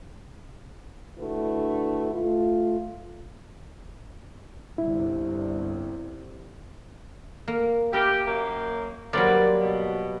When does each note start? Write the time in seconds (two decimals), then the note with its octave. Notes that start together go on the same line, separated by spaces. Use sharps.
1.18 D3 A3 D4 E4 F#4 B4
2.12 A3 F4
4.78 G1 C2 C3 E4
7.48 A#3
7.93 G4 A#4 E5
8.28 F#2 A#3
9.13 F#3 G3 A#3 B4 C5 D5
9.60 B2